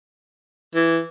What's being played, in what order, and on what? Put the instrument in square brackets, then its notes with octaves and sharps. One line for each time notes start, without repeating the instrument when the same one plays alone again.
[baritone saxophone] E3